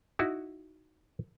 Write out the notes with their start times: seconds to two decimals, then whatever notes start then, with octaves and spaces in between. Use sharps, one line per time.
0.19 D#4 E4 F#4